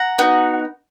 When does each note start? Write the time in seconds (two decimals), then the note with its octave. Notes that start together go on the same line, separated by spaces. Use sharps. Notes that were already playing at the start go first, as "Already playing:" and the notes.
Already playing: F#5 A#5
0.18 B3 D#4 F#4